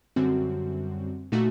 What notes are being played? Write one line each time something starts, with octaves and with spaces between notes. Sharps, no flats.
F#2 D3 G3 C4 F#4
A#2 A3 D#4 F#4